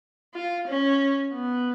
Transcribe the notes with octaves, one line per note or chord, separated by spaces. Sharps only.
F4
C#4
B3